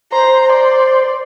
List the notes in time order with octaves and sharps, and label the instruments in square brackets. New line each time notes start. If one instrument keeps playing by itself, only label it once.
[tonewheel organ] C5 [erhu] A#5
[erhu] D5